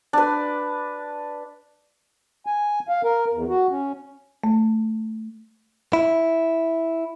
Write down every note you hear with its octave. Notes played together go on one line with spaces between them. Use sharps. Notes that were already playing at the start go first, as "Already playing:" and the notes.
D4 B4
G#5
F5
A#4
E2
F#4
C#4
A3
E4